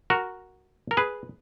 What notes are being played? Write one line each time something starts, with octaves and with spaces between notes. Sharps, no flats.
F#4 A#4
A#4
G#4 B4